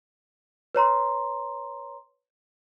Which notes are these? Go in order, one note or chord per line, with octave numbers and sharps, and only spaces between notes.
B4 C#5 A#5 C6